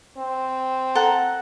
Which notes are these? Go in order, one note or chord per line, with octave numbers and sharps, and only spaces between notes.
C4
A4 F#5 A#5